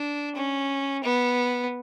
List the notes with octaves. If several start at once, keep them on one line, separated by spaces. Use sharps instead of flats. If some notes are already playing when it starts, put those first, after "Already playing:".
Already playing: D4
C#4
B3